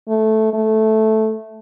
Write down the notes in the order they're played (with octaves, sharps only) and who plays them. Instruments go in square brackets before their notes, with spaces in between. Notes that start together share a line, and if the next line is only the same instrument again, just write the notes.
[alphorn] A3
A3